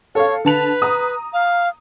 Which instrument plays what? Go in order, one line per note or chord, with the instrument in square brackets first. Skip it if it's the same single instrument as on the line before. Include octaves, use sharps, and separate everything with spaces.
[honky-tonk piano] A4 F5 [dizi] C#5
[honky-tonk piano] D3 A5 F7 [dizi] B4
[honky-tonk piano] A#5 D#6
[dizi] F5